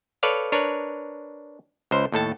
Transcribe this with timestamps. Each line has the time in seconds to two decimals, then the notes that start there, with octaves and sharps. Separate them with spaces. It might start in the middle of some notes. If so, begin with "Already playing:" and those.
0.23 A4 B4 C#5 D5 F5
0.52 D4 A#4 B4 C#5
1.91 C#2 C5
2.12 D#2 A2 A4 A5